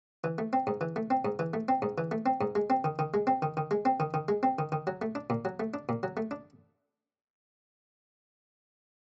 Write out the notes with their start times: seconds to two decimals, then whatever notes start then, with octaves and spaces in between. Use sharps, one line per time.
0.24 E3
0.38 A3
0.53 C4
0.67 G#2
0.81 E3
0.96 A3
1.10 C4
1.25 G#2
1.39 E3
1.54 A3
1.68 C4
1.82 G#2
1.98 E3
2.11 A3
2.26 C4
2.41 G#2
2.55 G#3
2.70 C4
2.84 D#3
2.99 D#3
3.14 G#3
3.27 C4
3.42 D#3
3.57 D#3
3.71 G#3
3.85 C4
4.00 D#3
4.14 D#3
4.28 G#3
4.43 C4
4.59 D#3
4.72 D#3
4.87 F#3
5.02 A3
5.15 D4
5.30 A#2
5.45 F#3
5.60 A3
5.74 D4
5.89 A#2
6.03 F#3
6.17 A3
6.31 D4